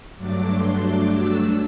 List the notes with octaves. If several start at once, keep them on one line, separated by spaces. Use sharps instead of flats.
G2 F#3 A3 D4 D6
C6
D6
E6